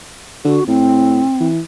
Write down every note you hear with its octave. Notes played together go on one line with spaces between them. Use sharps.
D3 F#4
A2 C4
E3